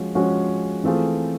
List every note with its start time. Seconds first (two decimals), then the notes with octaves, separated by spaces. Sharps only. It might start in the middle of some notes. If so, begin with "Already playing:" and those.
Already playing: F3 G#3 C#4 F#4
0.15 F3 G#3 C#4 F#4
0.84 E3 A3 C4 F4 G#4